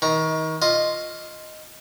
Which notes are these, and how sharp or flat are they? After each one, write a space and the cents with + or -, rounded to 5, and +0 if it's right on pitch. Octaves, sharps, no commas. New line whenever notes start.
D#3 +30 A#5 +0
F4 +0 D#5 +0